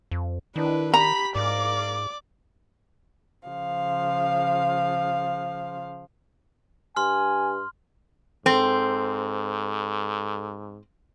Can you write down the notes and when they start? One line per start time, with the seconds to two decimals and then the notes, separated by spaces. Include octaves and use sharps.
0.11 F2
0.56 D#3 D4 E4 B4
0.94 G4 A#5 B5 B6
1.35 G#2 A#4 D5 F5 D6
3.46 C#3 F3 F5
6.96 G2 G#5 C6 F6
8.46 G#2 C4 A4